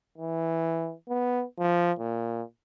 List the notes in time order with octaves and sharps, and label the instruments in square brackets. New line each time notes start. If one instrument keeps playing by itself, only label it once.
[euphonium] E3
B3
F3
A#2